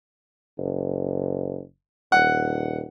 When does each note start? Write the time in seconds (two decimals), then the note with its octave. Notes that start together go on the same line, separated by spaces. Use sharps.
0.58 F#1
2.12 D#1 F#5